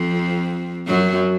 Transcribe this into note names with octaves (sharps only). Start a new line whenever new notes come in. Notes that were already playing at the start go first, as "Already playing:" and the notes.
Already playing: F2 F3
F#2 F#3